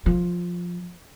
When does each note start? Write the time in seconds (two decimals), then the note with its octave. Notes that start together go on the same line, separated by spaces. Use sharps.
0.06 F3